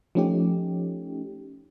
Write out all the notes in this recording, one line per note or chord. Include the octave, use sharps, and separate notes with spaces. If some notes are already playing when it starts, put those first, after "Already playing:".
F3 A3 C#4 D#4 G4